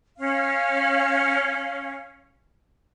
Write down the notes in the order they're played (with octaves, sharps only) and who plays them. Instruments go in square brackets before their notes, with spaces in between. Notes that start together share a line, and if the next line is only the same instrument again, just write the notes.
[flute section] C#4 F5